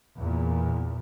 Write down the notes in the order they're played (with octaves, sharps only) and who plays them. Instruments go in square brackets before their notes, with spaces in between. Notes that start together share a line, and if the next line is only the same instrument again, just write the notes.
[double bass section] E2 A#2